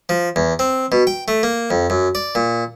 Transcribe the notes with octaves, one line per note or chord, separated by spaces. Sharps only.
F3
E2
C4
B2
G5
A3
A#3
F2
F#2
D5
A#2